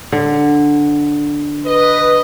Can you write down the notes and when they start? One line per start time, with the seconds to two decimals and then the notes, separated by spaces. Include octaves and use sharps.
0.12 D3
1.66 B4 D#5